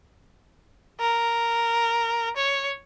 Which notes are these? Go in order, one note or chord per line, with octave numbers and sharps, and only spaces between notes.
A#4
C#5